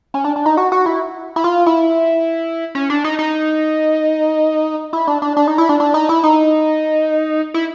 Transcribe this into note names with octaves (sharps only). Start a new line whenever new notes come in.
C#4
D4
D4
D#4
F#4
F#4
E4
E4
F4
E4
C#4
D4
D#4
D#4
E4
D4
D4
D4
D#4
E4
D4
D4
D#4
E4
D#4
E4